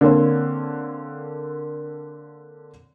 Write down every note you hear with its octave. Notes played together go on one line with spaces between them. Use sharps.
D3 A#3 C4 C#5